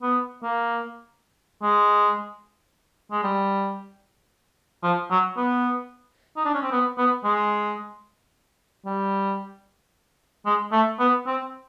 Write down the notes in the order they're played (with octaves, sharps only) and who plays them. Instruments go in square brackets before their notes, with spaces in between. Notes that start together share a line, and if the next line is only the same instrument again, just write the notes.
[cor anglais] B3
A#3
G#3
G#3
G3
F3
F#3
B3
D#4
D4
C#4
C4
B3
B3
G#3
G3
G#3
A3
B3
C4